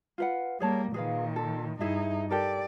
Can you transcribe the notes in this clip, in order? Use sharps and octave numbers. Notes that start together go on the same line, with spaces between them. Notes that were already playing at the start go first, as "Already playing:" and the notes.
F4 B4 F#5
G3 A#3 G#4 C#5 A5
A#2 D#3 G#4 B4 F5
A4
G2 D#4 E4 G#4 E5
G4 A4 A#4 D5